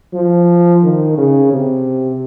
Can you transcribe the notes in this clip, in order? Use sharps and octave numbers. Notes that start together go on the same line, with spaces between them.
F3
D#3
C#3
C3